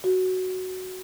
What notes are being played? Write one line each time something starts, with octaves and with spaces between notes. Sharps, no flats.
F#4